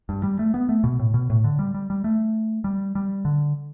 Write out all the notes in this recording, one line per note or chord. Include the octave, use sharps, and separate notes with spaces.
G2
G3
A3
B3
A3
B2
A2
B2
A2
D3
G3
G3
G3
A3
G3
G3
D3